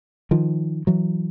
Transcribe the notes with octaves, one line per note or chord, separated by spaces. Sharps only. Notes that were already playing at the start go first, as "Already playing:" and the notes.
D#3 F3
E3 F#3